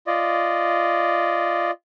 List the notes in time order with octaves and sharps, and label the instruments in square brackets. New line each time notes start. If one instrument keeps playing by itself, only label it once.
[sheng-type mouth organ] F4 D5 D#5